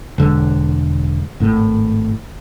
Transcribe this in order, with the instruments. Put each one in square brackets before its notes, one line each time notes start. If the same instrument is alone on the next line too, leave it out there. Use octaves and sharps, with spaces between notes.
[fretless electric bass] E1 D3 G#3
G#1 A2